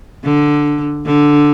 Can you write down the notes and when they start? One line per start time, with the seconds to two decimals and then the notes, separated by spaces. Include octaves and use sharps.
0.24 D3
1.06 D3